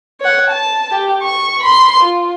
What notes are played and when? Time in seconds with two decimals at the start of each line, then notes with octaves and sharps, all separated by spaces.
0.20 C#5 F#5
0.50 A5
0.91 G4
1.22 C#6
1.60 B5 C6
1.99 F4